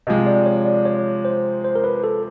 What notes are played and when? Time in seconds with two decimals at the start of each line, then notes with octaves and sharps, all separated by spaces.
0.07 C3 F3 G#3 D#5
0.27 D5
0.46 C#5
0.66 D5
0.85 C#5
1.25 C5
1.64 C5
1.75 A#4
1.84 B4
2.04 A4